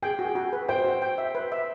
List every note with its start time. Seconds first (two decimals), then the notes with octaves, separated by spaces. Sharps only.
0.02 G#4 G5
0.19 F#4
0.24 G#4
0.35 F#4
0.53 B4
0.69 C5 G5
0.85 F#4
1.02 G5
1.18 E5
1.35 B4
1.52 E5